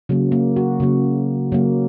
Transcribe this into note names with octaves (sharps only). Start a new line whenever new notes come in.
C#3 F#3 A#3
A#3
F#4
C#3 F#3 A#3
C#3 F#3 A#3